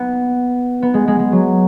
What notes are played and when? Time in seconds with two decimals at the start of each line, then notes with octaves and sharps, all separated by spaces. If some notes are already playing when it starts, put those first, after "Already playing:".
Already playing: B3
0.82 B3
0.94 G#3
1.08 G#3
1.19 G#3
1.32 F#3